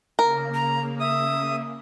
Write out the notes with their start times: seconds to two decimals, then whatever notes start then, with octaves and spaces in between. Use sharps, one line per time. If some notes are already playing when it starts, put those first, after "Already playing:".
0.19 C#3 A#3 A#4
0.54 A#5
1.00 E5 D#6